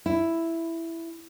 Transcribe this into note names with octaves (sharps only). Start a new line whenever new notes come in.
E4